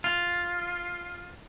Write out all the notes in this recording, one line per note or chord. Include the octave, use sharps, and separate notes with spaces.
F4